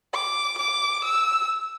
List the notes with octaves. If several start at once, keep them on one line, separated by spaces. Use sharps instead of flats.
D6
D6
E6